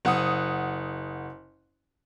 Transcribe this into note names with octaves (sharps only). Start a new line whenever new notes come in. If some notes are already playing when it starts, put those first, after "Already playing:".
F#1 F#5 D#6